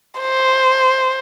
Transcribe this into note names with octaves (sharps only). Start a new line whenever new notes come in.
C5